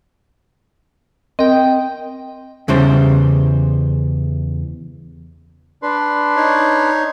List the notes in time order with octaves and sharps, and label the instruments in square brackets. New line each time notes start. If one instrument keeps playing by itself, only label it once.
[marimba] C4 A#4 [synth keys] D#5 G5
[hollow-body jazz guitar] E2 C#3 E3 G3 C5
[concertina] D4 B4 C6
[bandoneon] D#4 C#5